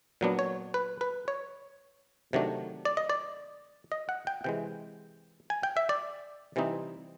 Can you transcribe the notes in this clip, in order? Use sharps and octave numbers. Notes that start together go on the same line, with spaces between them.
A#2 F#3 B3 D4
C#5
B4
B4
C#5
C3 D#3 F#3 A3 D4
D5
D#5
D5
D#5
F#5
G5
C3 E3 G#3 G5
G#5
G5
E5
D5
C3 E3 G3 C4 D#4